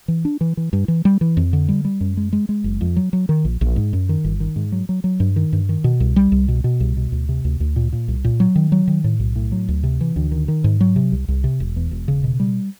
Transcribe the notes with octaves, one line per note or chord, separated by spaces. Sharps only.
E3
D4
E3
E3
G2
E3
G3
E3
F2
D3
G3
G3
F#2
G#3
G#3
G#3
F#1
F2
F#3
F#3
D#3
A#1
A#1
G#2
F#2
D#3
G1
D#3
G#2
F#3
F#3
F#3
G2
D#3
G2
D#3
B2
C2
G3
C2
B2
B2
C2
B2
D2
C3
D2
D2
A#2
A#2
C2
A#2
F#3
D#3
F#3
D#3
A2
B1
A2
F#3
D2
C3
E3
D2
D#3
D#3
G#2
F#3
C3
C2
C2
C3
E1
E2
E1
C#3
B2
G3